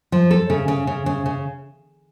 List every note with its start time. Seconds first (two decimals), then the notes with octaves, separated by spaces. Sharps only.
0.12 F3
0.31 A4
0.50 C#3
0.68 C#3
0.87 C#3
1.06 C#3
1.26 C#3